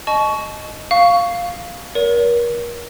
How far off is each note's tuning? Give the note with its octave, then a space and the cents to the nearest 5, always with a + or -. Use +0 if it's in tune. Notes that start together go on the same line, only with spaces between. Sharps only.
D#5 -10 A5 -40 C#6 +15
F5 +0 C#6 +15
A#4 +35 C#5 +40